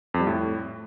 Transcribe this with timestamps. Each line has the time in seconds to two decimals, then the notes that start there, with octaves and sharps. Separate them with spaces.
0.14 F2
0.20 G3
0.27 A2